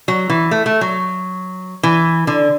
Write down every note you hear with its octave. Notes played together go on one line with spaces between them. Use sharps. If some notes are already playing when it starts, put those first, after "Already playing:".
F#3
E3
A3
A3
F#3
E3
D3